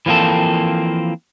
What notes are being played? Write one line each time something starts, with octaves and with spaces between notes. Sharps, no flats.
E3 F3 A#3 C4 A4